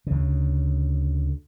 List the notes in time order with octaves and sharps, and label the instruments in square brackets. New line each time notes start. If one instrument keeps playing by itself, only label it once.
[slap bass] D2 C#3